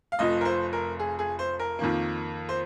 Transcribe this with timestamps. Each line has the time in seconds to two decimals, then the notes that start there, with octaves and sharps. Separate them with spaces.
0.12 F5
0.19 F1 F2 F3 D#5
0.41 A#4
0.45 C5
0.73 A#4
0.99 G#4
1.19 G#4
1.39 C5
1.59 A#4
1.79 F2 D#3 A#3
2.49 C5